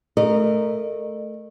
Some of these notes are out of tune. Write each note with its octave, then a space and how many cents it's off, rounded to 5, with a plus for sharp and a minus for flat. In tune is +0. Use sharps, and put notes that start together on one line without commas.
A3 -10 A#4 +0 D#5 -35